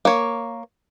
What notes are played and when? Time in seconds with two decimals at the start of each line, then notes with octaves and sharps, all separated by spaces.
0.05 A#3 C#5